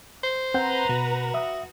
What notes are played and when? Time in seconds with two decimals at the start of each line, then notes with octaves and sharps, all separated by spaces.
0.23 C5
0.54 C4 B4 F#5 A#5 G6
0.89 B2 F#4
1.34 E5 D#6